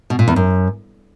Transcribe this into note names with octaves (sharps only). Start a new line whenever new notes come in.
B2
A#2
E2
F#2